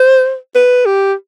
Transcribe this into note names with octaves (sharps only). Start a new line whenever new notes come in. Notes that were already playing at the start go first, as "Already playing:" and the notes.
Already playing: C5
B4
G4